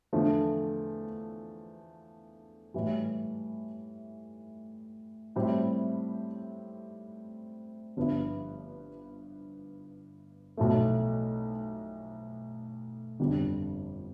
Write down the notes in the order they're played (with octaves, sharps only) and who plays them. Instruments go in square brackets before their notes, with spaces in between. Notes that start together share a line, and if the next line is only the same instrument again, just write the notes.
[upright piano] E2 D3 F3 A3
A2 E3 G3
A2 G3 C4 E4
G1 G2 F3 B3 E4
B1 A2 F3 A3
G1 F2 D3 G3